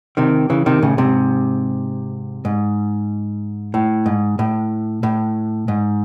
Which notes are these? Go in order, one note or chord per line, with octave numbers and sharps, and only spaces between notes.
C3 D#3
C#3 E3
C3 D#3
A2 C#3
G#2 C3
G#2
A2
G#2
A2
A2
G#2